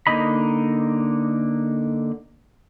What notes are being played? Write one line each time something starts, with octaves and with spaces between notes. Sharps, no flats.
D3 A#3 D#4 D#5 B5